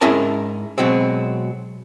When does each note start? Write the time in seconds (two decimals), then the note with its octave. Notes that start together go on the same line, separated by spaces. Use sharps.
0.01 G#2 C#4 E4 G#4 A#4 A5
0.78 B2 F#3 G#3 C4